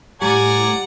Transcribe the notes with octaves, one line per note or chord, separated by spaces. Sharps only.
A2 G3 G4 D5 F#5 G#5 A#5